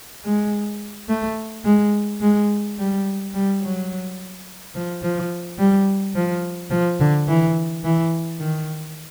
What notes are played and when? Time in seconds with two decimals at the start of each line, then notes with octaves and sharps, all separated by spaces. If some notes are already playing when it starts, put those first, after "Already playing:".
0.24 G#3
1.09 A3
1.65 G#3
2.21 G#3
2.78 G3
3.34 G3
3.61 F#3
4.75 F3
5.02 F3
5.58 G3
6.15 F3
6.70 F3
7.00 D3
7.28 E3
7.84 E3
8.39 D#3